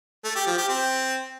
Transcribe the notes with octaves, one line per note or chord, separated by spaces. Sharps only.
A3
G4
F3
G4
C4